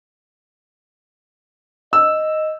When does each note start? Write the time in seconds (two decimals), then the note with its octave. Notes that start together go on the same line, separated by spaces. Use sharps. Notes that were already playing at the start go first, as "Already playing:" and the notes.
1.93 D#5 E6